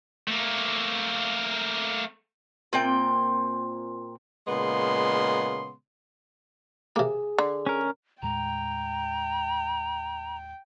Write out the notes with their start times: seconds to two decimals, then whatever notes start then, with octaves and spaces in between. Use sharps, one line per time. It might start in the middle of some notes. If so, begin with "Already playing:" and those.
0.28 A3 A#3
2.73 A#2 C4 G5
4.47 A#2 C#3 G#3 B3 C6
6.96 C3 A#3 G#4
7.38 D3
7.66 C#4 A#4
8.22 D#2 A2 G#3 G5 A#5